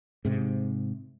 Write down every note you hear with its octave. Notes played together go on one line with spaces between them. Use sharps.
G#2 C3